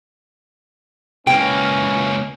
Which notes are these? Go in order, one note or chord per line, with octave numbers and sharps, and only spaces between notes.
C#2 E3 A#3 C#4 G5